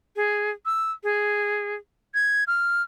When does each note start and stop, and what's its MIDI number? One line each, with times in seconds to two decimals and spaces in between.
0.16 0.51 68
0.66 0.92 88
1.03 1.75 68
2.14 2.44 92
2.47 2.82 89